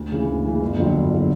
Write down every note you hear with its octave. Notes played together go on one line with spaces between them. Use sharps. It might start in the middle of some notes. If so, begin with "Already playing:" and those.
Already playing: D2
C#3 E3
D2
C#3 E3
G1
F2 D3 F#3
G1
D3 F#3